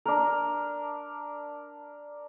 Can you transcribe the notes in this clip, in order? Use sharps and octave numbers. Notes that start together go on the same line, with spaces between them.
D4 A#4